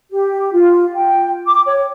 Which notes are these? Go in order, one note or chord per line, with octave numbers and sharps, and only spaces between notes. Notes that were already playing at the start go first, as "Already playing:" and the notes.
G4
F4
G5
D6
C#5